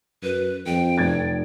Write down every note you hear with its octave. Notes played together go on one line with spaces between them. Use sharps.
F#2 B4
F2 G5
F1 G#6 A6